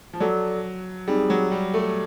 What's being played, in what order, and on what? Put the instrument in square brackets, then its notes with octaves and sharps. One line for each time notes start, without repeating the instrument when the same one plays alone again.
[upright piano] F3
[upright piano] F#3 [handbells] F#4 A4 D5
[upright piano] G3 [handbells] C4 D#4 G#4
[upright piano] F#3
G3
A3